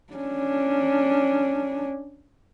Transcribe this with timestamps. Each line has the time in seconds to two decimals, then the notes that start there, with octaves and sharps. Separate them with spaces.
0.13 C#4 D4